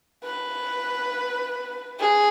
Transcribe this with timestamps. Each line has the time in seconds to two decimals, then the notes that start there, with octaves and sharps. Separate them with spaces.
0.24 B4
2.00 G#4